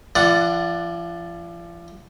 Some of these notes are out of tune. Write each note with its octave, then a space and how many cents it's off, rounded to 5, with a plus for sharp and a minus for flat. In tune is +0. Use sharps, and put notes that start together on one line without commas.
F3 -45 D5 +0 F#5 -5